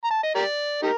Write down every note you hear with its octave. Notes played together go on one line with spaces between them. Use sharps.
A#5
A5
D#5
G4 A#4 D5
D#4 G4 A#4